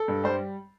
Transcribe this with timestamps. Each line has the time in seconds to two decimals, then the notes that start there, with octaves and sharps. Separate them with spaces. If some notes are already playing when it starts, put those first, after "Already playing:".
Already playing: A4
0.08 G2
0.24 G3 C5